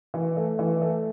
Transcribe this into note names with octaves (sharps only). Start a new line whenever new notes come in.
E3
A3
E3
A3